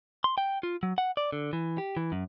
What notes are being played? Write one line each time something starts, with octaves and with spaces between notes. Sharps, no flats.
C6
G5
F4
F#3
F#5
D5
D3
E3
G4
E3
F#2